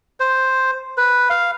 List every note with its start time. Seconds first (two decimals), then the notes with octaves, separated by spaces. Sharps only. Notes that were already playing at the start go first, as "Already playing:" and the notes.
0.20 C5
0.98 B4
1.30 F5